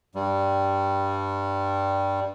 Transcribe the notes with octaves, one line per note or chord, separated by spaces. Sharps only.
G2 G3